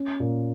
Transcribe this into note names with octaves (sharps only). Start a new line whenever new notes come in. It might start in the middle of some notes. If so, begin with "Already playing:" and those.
Already playing: C#4
A#2